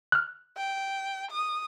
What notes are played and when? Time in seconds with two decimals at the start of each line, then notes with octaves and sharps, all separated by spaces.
0.12 F6 F#6
0.57 G5
1.31 D#6